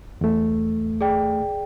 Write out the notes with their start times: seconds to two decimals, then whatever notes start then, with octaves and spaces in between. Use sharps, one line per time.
0.21 E2 A3
1.01 G#4 D5 G5